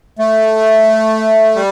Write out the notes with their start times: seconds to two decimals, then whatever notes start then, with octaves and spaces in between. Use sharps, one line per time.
0.19 A3
1.56 G3